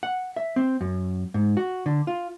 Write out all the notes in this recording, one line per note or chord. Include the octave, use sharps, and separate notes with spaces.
F#5
E5
C4
F#2
G#2
F#4
D3
F4